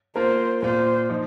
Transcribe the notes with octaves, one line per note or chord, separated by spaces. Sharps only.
A#3 F4 A#4 C5
A#2 A#3 F4 C5
F3 D#4 C5